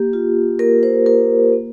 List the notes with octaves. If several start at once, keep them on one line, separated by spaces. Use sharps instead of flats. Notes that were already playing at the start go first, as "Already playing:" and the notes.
Already playing: A#3 G4
F4
A#3 A#4
C5
F4 A#4
A#3